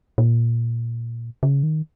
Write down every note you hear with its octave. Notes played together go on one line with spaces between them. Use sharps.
A#2
C#3
D#3